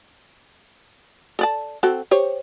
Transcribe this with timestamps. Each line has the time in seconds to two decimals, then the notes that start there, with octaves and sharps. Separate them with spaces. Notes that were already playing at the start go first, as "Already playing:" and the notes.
1.39 A4 D5 A5
1.83 C4 F#4 A4
2.11 G4 C5 C#5